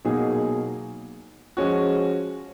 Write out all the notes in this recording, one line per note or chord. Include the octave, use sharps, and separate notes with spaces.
B2 F#3 A#3 D#4 G#4
F3 G#3 C#4 F#4